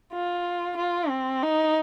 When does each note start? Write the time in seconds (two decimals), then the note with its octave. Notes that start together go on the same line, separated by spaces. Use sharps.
0.13 F4
0.77 F4
1.09 C4
1.42 D#4